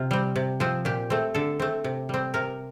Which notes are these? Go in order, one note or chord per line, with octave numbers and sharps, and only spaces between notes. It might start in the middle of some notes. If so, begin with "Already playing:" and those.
Already playing: C3 F4
G3 C4
C3
F3 C4
A#2 G4
A3 C4
D3 A4
A3 C4
C3
G3 C4
C3 A#4